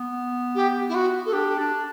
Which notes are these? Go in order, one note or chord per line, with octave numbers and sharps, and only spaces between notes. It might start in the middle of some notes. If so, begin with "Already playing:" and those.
Already playing: B3
G4
E4
F#4
A4
D4 G4
D4